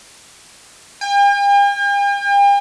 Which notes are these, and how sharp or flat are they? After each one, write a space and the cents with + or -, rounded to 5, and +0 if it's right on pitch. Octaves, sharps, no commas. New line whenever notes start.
G5 +45